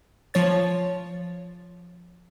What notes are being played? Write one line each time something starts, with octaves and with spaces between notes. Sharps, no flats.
F3 C#5 A6